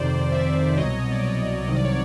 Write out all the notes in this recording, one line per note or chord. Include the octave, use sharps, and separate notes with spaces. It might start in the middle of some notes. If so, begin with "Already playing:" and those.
Already playing: F2 C3 D#3 C5 D5
D5 E5
C2 B2 F#3 C#5 D#5
C#5
D5
C#5 D#5
C2 C3 D#3 F#3 D#5
D5
C#5